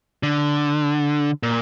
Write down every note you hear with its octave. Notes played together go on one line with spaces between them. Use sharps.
D3
A#2